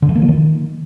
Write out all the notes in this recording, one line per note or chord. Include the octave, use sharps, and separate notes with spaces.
D3
E3
A#3
F3
D#3